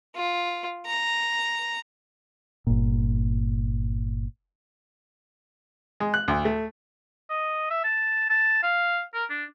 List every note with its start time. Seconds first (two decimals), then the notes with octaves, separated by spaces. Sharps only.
0.15 F4
0.86 A#5
2.67 G1 A#2
6.00 G#3
6.14 F#6
6.28 D2
6.45 A3
7.30 D#5
7.70 E5
7.84 A5
8.29 A5
8.63 F5
9.14 A#4
9.30 D4